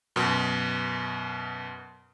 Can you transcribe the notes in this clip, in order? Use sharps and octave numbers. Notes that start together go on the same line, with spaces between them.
F#2 B2